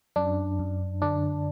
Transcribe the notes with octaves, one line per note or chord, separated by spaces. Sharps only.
F#2 D4
F#2
D3 D4